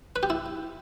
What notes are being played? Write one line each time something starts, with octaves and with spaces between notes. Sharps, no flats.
B4
G4
E4